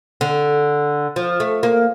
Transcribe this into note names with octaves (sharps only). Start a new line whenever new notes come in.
D3
F3
A3
A#3